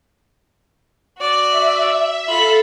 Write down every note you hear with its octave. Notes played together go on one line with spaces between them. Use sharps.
F#4 D5
E5
F4 A4 B5